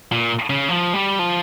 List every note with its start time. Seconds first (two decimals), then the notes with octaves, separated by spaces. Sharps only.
0.12 A#2
0.50 C#3
0.69 F3
0.94 G3
1.19 F3